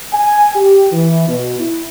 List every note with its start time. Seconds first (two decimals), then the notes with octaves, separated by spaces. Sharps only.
0.13 G#5
0.56 G4
0.92 E3
1.28 B2
1.59 E4